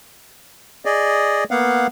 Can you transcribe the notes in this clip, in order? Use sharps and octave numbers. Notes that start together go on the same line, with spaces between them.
G#4 D5 D#5
A#3 B3 F5 F#5